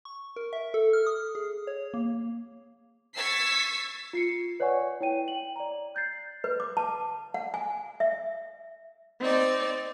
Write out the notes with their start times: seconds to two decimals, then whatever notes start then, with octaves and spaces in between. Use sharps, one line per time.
0.05 C#6
0.36 A#4
0.53 E5
0.74 A4
0.93 F6
1.06 D#6
1.35 G#4
1.67 C#5
1.94 A#3
3.14 C#6 E6 G#6 A6 B6 C7
4.13 F4 C7 C#7
4.60 B4 C#5 D5 F#5 G#5 C#6
5.01 E4 C#5 G5 D#7
5.28 G5 F#7
5.56 D5 A#5
5.95 F#6 G6 A6 C7
6.44 B4
6.60 D6
6.77 A5
7.34 F#5
7.54 G#5
8.00 E5
9.21 C4 D#4 D5